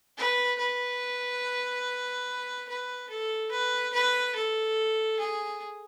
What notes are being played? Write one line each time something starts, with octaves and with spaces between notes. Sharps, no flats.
B4
B4
B4
A4
B4
B4
A4
G#4